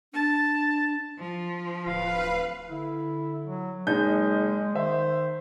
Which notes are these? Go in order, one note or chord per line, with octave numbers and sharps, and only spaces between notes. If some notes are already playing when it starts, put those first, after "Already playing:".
D4 A5
F3
D1 B4 F5
D3 E4
F#3
F#1 G#3 D#4 G#4 G6
D#3 C5 E5